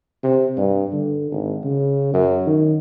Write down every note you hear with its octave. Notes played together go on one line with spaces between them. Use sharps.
C3
G2
D3
G#1
C#3
F#2
D#3